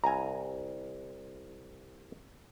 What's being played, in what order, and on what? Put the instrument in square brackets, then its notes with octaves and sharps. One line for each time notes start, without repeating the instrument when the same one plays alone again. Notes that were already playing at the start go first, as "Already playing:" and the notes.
[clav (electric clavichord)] C2 G#5 [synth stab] A#5